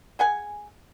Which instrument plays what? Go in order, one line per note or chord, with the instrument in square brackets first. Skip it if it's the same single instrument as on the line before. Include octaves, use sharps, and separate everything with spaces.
[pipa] G#4 F#5 G#5